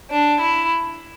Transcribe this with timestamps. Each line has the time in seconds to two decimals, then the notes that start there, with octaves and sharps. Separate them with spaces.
0.11 D4
0.41 E4